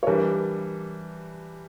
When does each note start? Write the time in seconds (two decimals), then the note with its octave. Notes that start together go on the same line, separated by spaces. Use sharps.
0.03 C#5
0.07 E3 G3 D4 A#4